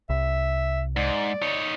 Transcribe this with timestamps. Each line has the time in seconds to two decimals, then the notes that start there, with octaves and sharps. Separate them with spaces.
0.10 C2 E5
0.97 G#2 D5
1.42 D#4 C#5